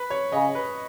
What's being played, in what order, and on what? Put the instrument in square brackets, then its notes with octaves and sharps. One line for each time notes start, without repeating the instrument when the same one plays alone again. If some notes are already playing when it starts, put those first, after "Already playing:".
Already playing: [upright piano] B4
C#5
[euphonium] C#3 [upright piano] D#5
[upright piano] B4